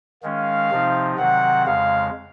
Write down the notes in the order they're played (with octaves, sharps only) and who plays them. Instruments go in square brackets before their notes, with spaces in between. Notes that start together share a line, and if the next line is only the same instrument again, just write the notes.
[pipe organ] D#3 G#3 C#4 [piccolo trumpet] F5
[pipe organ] C3 F3 C4 D#4
[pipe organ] C3 D#3 F#3 C4 [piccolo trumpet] F#5
[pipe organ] F2 C#3 G#3 [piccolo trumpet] F5